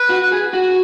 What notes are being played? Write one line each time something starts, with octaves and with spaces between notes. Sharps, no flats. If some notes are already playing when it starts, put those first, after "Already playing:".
Already playing: B4
F#4
G#4
F#4